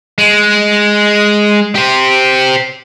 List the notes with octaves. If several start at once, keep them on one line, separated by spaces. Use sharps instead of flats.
G#3
G4 C5